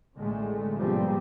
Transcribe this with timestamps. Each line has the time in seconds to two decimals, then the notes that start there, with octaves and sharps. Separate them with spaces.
0.16 A1 D3 G#3 A3
0.77 G#2 B2 F3 G3 A#3 C4